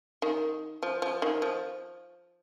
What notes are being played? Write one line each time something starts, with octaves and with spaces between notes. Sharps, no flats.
D#3
F3
F3
D#3
F3